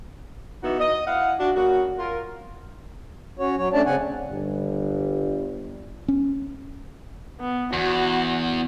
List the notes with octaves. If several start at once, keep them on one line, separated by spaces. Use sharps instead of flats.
E3 B3 D#4 F#4 E5
D#5
E4 F5 F#5
D4 F#4
C#3 A#3 F#4
F4 A#4
C#4 F#4 C#5
F#3 C#5
A3 C#4 D4 D5 A5
C#3 C4 F#5 G#5
G1 G2
C#4
B3
E2 F#4